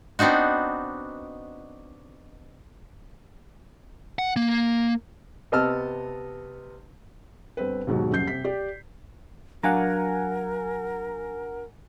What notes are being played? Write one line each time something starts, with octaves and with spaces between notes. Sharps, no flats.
B3 C4 D4 D#4 F#4
F#5
A#3
C3 B3 D#5 A5 E6 F6
G1 C4 B4
D#2 G#2 B2 F#3
D#1 F#2 C#3 G6 C7
C3 B6
G4 D5
F#3 D4 A#4 F5 F#5 G#5 A#5